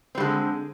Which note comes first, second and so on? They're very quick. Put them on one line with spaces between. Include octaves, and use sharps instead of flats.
C4 G3 D3 G#3